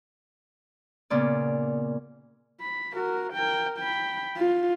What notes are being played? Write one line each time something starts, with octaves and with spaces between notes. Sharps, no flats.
A#2 C#3 B3 D5
B5
F#4 A#4
A#4 G5
G5 B5
F4